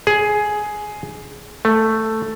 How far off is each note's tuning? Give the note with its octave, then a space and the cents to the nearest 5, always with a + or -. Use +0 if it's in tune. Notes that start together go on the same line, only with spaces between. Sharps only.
G#4 +10
A3 +5